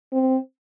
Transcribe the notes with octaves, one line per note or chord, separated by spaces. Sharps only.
C4